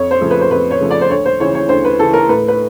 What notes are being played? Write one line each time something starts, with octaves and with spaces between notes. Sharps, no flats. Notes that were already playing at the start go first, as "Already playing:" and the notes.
Already playing: F2 C#5
C5
C#3 F3 A3
B4
C5
F2 B4
C#5
C#3 F3 A3
D5
C5
D2 C#5
C5
C#3 E3 C#5
C#5
D2 C5
B4
C#3 E3 A4
A#4
A2 B4
B4